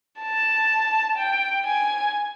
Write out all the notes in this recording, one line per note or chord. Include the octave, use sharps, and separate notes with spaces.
A5
G5
G#5